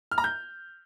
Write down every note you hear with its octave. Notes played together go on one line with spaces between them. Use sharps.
F6
A#5
G6